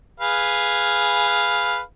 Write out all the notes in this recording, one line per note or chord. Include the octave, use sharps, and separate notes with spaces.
G#4 B4 F5